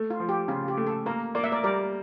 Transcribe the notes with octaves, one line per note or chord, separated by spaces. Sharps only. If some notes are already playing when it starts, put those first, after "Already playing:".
Already playing: A3
F4
F3
G4
C#3 F4
G4
A3
A4
A#3 A#4
A#3 D5
E5
A#4 D5
G3 A#4 D5